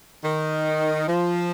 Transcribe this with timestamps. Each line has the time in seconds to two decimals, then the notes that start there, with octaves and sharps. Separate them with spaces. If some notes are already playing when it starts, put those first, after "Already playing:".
0.24 D#3
1.08 F3